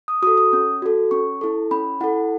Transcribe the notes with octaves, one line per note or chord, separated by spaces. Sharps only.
D#6
F#4 A4 D#6
D#6
C#4
F#4 A4
C#4 C#6
E4 A4
C#4 B5
E4 A4 F#5